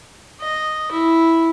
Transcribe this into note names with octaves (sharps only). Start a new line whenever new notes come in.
D#5
E4